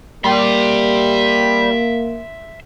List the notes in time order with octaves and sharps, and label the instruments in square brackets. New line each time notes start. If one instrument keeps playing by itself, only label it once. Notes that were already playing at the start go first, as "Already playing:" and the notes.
[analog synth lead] G3 [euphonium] A#3 [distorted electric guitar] E5 C6